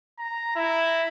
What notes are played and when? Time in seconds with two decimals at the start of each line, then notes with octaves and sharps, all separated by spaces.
0.19 A#5
0.56 E4